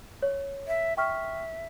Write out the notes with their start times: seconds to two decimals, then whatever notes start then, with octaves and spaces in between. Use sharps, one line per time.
0.22 C#5
0.68 E5
0.97 E5 G5 C#6 F6